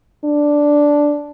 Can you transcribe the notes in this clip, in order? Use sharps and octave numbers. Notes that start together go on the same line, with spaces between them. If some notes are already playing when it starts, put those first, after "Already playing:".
D4